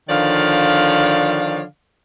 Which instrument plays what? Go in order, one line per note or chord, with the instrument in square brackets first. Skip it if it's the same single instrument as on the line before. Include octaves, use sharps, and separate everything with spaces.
[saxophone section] D3 D#3 F3 C#5 D5 F5